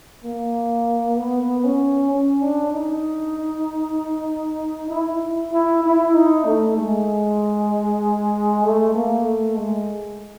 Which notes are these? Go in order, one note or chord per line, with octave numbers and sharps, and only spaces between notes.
A#3
B3
C#4
C#4
D4
D#4
E4
E4
E4
D#4
A3
G#3
A3
A#3
A3
G#3